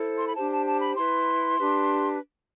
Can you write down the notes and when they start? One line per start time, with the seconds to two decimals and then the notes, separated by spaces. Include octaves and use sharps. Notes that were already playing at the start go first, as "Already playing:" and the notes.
Already playing: E4 A4 C5
0.16 C6
0.26 B5
0.35 D4 G4 C5 A5
0.51 A5
0.66 A5
0.80 B5
0.96 E4 B4 C6
1.58 D4 G4 B4